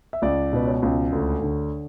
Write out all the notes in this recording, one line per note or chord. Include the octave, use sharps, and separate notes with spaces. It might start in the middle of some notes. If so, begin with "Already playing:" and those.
E5
C#2 D5
B2 B4
C#5
C#2
D2
D3